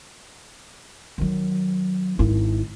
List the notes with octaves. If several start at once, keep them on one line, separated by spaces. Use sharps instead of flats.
D#3 F#3
G#1 E4